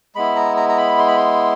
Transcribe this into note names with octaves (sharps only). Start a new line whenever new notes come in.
G#3 B3 E4 B5
A#5
A#5
A#5
B5
C6
B5
C6